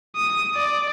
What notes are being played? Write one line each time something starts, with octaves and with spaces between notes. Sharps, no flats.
D#6
D5